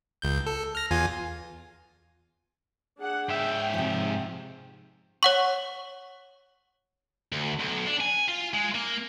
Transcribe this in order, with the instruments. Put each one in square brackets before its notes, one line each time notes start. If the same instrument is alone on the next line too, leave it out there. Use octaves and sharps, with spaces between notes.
[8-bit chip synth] C#2 G6
A4
F6 A#6
E2 F4 G#5
[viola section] D4 G#4 F#5
[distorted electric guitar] G#2 E5 [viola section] G5
[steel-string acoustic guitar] C3 F3
[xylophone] C#5 F#5 C#6
[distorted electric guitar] D2
B1
D4
G#5
F4
G#3
A#3